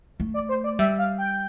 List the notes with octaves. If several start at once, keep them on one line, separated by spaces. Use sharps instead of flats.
A3
D5
C5
D5
G3 E5
F5
G5